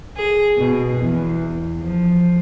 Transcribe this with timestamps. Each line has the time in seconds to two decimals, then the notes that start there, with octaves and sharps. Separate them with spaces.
0.16 G#4
0.57 B2
0.98 E2
1.82 F3